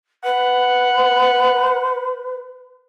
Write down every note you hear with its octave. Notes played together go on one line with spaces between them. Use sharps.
B4 F#5